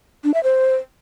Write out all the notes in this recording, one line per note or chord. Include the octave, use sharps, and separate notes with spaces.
D4
E5
C5